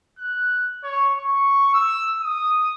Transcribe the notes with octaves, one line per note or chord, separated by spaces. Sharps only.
F#6
C#5
C#6
E6
D#6